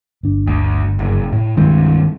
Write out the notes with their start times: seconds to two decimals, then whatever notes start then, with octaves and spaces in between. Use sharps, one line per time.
0.23 G1 D4
0.47 D2
0.99 F#1
1.33 A2
1.57 C2 G2 D#3 E3 G#3 C4